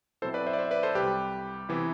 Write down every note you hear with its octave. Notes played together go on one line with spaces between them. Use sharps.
B2 F#3 C4 E4 A4 C5
B4 D5
C5 E5
D5
C5 E5
B4 D5
A4 C5
C2 C3 G3 G4 B4
C3 E3 B3 E4